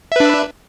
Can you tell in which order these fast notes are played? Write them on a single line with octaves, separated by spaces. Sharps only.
E5 B4 D4